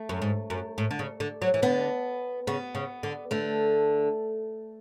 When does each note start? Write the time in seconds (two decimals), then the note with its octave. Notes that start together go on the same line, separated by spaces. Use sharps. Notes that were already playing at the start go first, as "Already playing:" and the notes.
Already playing: A3
0.09 F#2
0.22 G#2
0.50 F#2
0.78 A2
0.91 D3
0.99 C#3
1.20 D3
1.42 F#3
1.54 E3
1.62 D3 B3
2.47 C#3 B3
2.75 C#3
3.03 D3
3.31 D3 A3